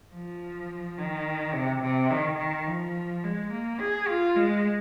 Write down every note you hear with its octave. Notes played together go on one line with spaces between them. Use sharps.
F3
D#3
C3
C3
D#3
D#3
F3
G#3
A#3
G#4
F4
G#3